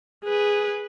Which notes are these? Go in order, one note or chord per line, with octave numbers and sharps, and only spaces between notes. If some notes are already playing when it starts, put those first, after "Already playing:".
G#4 B4